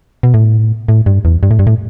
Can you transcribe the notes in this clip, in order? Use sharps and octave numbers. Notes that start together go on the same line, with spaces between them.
B2
A2
A2
G2
E2
G2
A2
G2
A2